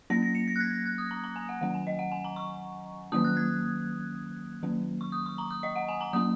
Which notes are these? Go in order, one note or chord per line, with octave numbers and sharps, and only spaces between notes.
F#3 A#3 C#4 A#6
A#6
C#7
A#6
F#6
G#6
G#6
F#6
D#6
A#5
A#5
G#5
F#5
D#3 F#3 C#4 F#5
G#5
D#5
F#5
G#5
A#5
C#6
D#3 F#3 A#3 C#4 D#6
F#6
G#6
D#3 F#3 A#3 C#4
C#6
D#6
C#6
A#5
D#6
D#5
F#5
G#5
A#5
F#3 A#3 C#4 D#6